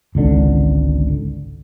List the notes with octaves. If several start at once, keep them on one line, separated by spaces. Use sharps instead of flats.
G#1 C#2 D3